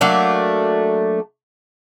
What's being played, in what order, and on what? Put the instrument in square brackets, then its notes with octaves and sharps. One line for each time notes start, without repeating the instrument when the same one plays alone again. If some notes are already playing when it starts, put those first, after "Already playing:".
[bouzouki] F#3 A3 A#3 D4